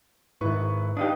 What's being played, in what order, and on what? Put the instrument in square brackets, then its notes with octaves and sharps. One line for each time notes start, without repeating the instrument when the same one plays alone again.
[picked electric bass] G#2 D#3 [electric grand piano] E4 B4 C#6
[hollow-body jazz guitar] D4 D#4 G4 [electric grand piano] B4 F5 D#6